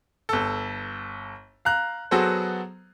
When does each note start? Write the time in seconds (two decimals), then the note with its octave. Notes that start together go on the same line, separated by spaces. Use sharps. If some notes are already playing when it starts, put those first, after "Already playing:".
0.29 G1 A4
1.65 F5 A#5 F#6
2.11 F#3 B3 F#4 G#4 A4 C5